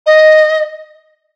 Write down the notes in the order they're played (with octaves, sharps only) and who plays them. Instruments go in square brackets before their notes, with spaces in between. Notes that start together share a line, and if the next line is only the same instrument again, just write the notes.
[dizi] D#5